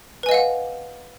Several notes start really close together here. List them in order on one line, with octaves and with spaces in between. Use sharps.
B4 G#5 D#5 F5 F#5